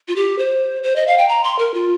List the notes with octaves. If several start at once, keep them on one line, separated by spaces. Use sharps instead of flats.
F4
G4
C5
C5
D#5
F5
G5
A#5
C6
A#4
F4